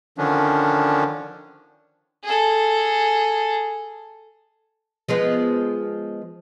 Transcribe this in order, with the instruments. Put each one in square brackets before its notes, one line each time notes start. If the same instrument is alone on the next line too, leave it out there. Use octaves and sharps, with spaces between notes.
[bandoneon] D3 D#3 F3 C#4 D4
[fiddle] G#4 A4
[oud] F3 G#3 B3